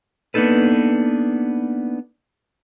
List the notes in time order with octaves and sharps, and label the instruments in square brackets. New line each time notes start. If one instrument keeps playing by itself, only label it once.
[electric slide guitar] A#3 B3 D4 D#4 A4 B4